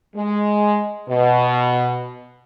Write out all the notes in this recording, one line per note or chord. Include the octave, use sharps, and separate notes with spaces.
G#3
B2